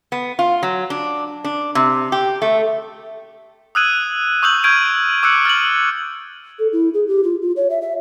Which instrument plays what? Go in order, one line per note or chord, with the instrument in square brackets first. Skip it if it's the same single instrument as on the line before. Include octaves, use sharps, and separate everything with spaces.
[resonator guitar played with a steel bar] B3
F4
F#3
D4
D4
C3
G4
A3
[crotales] D#6 E6 F#6 G#6 D#7 F#7
C#6 D#6 E6 G6 D#7 F#7
C#6 F6 G6 G#6 D7 D#7
D6 E6 F#6 C#7
F6 A6 D#7 F#7
[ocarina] A4
E4
G#4
G4
F4
F4
C#5
E5
E5